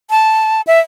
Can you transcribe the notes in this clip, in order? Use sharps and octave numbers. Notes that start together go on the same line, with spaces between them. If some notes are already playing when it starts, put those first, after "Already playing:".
A5
E5